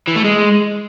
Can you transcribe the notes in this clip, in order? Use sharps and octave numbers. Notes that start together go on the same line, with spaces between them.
E3
A3
G#3